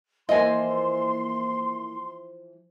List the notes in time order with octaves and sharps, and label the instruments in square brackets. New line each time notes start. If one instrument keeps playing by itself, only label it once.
[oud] E3 F3 F4 [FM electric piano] A#3 E4 [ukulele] D#5 G#5 [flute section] C6